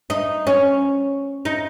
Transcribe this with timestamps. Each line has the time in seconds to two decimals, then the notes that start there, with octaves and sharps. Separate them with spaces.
0.10 D#4
0.47 C#4
1.45 D#4